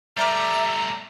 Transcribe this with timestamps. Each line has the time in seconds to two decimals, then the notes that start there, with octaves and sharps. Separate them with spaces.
0.17 G3 A3 D5 E5 A#5 D6 F6